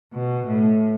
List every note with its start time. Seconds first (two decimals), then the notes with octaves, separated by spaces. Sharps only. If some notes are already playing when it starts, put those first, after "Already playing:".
0.13 B2
0.48 A2